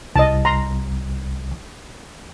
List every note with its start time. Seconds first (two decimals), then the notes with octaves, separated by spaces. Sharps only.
0.16 C2 D#5 A5
0.45 A#5 C6